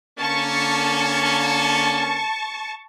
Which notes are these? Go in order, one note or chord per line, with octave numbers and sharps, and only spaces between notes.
D3 A#3 C#4 A5 C#6